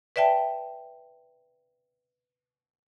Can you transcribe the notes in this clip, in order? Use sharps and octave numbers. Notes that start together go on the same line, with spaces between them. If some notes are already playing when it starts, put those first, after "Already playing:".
B4 D5 E5 G5 A5